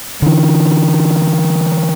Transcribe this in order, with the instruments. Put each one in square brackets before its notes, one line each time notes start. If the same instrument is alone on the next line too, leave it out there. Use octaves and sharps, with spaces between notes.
[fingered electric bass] D3 E3